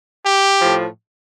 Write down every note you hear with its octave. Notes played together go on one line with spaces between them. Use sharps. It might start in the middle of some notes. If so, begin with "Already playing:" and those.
G4
A2 F3